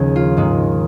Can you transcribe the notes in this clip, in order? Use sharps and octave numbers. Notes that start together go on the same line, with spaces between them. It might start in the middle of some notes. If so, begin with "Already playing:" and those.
Already playing: D#2 C#3 F3 G#4
F4
G#2 D#3 G#3